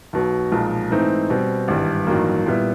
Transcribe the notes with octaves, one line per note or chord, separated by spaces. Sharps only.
B1 B2 F#3
B1 A#2 F3 G#3
G#2 E3 A3 C4 D#4
B2 G3 C4
G#1 G2 E3 G3
A1 G2 D#3 F#3 A#3
A#2 G3 B3 E4